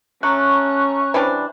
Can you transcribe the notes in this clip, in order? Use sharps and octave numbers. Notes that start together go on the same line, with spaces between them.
A3 C#4 A#5 C#6 F#6
E3 G3 D4 C5